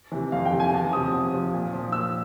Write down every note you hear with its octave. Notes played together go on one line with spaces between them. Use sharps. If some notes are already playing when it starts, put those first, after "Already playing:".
C3 E3
F2 F5
G5
C3 E3
G#5
E2 A5
C3 F3 D#6
E2
C3 F3
A#2
F3
A#2 E6